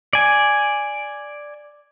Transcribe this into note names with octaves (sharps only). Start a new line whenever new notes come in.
D5 G#5